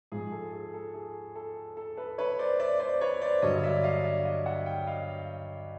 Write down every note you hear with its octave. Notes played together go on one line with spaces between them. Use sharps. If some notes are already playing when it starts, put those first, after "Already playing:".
G#2 F3 G#4
A4
G#4
A4
G#4
A4
A4
A4 B4
B4 C#5
C5 D5
D5 E5
C5 D5
B4 C#5
C5 D5
G2 D3 F#3 C#5 D#5
D5 E5
D#5 F5
D5 E5
D#5 F5
E5 F#5
F5 G5
D#5 F5